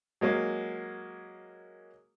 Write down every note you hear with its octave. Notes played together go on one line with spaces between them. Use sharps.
F#3 G#3 A#3 C#4